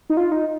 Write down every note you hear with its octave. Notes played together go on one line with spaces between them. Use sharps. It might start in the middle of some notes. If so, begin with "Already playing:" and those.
D#4
F4
D#4